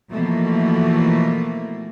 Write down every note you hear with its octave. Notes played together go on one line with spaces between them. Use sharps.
B2 E3 F3 A3 A#3